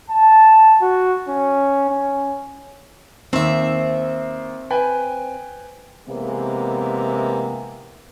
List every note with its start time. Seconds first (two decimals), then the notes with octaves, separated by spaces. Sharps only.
0.10 A5
0.82 F#4
1.29 C#4
1.90 C#4
3.33 D#2 C4 E5
4.71 B4 G5 G#5
6.08 C3 E3 G#3 A#3 B3